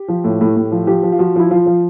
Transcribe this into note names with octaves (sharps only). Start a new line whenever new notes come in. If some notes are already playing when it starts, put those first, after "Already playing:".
Already playing: G4
F3
A2
A2
A2
F3
F3 G4
F3
F4
F3 F#4
F3 E4
F3 F4
F3